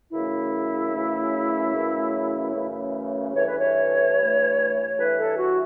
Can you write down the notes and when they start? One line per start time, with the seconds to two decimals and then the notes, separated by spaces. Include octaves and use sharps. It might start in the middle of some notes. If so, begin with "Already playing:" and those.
0.11 F#2 C#3 E3 A3 C#4 E4
0.92 F#2 C#3 E3 A3 C#4
1.73 F#2 C#3 E3 A3 C#4
2.54 F#2 C#3 E3 A3 C#4
3.35 G2 E3 A3 C#5
3.47 B4
3.59 C#5
4.17 G2 E3 A3
4.97 G2 E3 A3 B4
5.18 A4
5.38 F#4